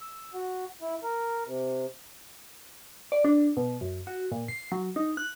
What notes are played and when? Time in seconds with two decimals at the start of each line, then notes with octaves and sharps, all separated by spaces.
0.01 E6
0.34 F#4
0.82 E4
1.03 A#4
1.46 C3
3.12 D5
3.24 D4
3.57 B2
3.81 F#2
4.07 F#4
4.32 A#2
4.48 C7
4.72 F#3
4.96 D#4
5.17 F#6